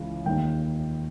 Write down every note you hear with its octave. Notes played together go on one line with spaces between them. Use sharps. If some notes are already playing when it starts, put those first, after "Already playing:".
Already playing: C#2 C#3 E3
D#2 D#3 G5